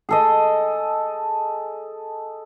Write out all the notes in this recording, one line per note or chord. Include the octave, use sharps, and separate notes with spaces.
G#4 A4 D#5